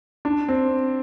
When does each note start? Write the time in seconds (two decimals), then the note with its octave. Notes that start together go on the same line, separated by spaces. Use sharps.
0.25 D4
0.48 C4